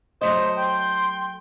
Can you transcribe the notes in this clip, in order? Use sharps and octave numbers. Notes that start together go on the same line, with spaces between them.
F#3 A3 C5 D#5
G5 C6